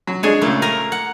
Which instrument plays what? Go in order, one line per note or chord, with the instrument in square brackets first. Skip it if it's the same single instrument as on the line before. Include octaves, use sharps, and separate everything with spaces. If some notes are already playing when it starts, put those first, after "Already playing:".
[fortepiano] F#3
[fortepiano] G#3 D4 G#4 [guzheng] C#5 G#5
[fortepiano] C#2 A#2 [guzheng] A3
[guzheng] A#4 G#5 A#5
F#5